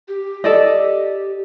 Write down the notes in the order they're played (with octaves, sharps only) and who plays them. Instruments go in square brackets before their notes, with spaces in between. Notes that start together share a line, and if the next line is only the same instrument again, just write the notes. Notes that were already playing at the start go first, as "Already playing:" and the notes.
[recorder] G4
[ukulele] A4 D5 D#5